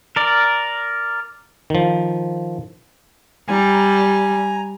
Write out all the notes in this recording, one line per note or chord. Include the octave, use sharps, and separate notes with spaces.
A#4 D5
D#3 F3
G3 G#5 A#5